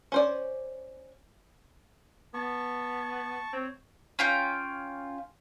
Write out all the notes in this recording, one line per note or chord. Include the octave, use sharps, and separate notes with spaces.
C#4 C5 D5
B3 A5 C#6
C4 C#5
C#4 F4 G5